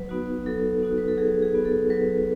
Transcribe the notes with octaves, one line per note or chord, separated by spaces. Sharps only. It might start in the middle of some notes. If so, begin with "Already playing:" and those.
Already playing: F#3 B4
B3 D#4 F#4
F#3 A4
B3 D#4 F#4
B4
A4
F#3 G#4
G#4
B3 D#4 F#4
A4
F#3 B4